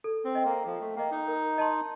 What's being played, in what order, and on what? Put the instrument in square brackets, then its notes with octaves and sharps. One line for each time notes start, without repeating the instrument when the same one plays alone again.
[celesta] A4
[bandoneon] C4
[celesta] D#5 G5
[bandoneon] A#3
[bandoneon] F3 [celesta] A4
[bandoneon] A3
[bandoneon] A#3 [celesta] D#5 G5
[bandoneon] D#4
[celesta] A#4
D#5 A5 C6